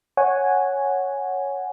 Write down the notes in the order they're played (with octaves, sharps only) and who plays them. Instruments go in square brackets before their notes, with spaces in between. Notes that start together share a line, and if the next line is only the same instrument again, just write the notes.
[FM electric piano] C#5 F#5 G#5